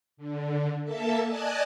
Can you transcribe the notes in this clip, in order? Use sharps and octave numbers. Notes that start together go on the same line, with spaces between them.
D3
A#3 A4 E5 A5
D5 D#5 G#5 A5 F#6 G#6